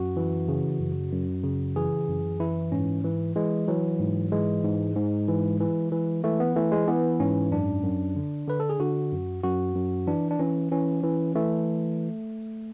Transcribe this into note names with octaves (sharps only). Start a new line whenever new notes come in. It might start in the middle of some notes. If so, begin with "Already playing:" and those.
Already playing: F#2 F#4
E3
C#3
F#2
F#2
C#3
E3 G#4
F#2
E3 E4
G#2 C#4
E3
E3 G#3
E3 F#3
G#2
E3 G#3
G#2
G#2
E3
E3
E3
E3 A3
B3
E3 A3
G#3
E3 B3
G#2 C#4
F#2 D4
F#2
D3
D3 B4
A4
G#4
D3 F#4
F#2
F#2 F#4
F#2
E3 D4
D4
E3 C#4
E3 C#4
E3
E3 A3